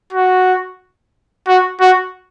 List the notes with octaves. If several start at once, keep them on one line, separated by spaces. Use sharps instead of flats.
F#4
F#4
F#4